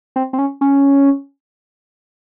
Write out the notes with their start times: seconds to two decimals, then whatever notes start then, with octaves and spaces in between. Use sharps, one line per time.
0.16 C4
0.33 C4
0.39 C#4
0.61 C#4